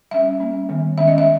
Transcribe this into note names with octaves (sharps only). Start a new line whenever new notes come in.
G3 C#4 E5
G3 A#3 C#4
D#3 G3 B3
D#3 G#3 C#4 E5
D#5
E5